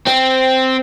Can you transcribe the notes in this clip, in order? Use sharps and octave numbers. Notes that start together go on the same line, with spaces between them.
C4